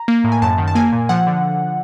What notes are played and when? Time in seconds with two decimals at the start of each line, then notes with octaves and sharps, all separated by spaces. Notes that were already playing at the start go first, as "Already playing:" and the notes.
Already playing: A#5
0.08 A#3
0.24 A2
0.32 G#5
0.42 F#2 A5
0.58 D#3
0.68 A5
0.75 A#3 G#5
0.93 A#2
1.09 F3 F#5
1.27 D3